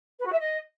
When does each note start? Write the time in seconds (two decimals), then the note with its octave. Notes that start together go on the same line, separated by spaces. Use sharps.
0.19 B4
0.26 F#4
0.33 E5
0.40 D#5